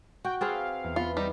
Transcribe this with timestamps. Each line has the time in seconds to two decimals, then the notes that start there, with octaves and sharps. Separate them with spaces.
0.25 F#4 G5
0.41 C4 G#4 B4 F5 A6
0.84 E2
0.96 B3 F4
1.17 G3 D#4